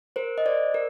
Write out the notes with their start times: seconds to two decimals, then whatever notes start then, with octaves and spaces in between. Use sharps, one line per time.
0.16 A#4 C5
0.38 D#5
0.46 C5 D5
0.74 A#4